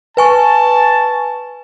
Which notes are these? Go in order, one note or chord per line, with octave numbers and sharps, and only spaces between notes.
B4 G#5 A5 C#6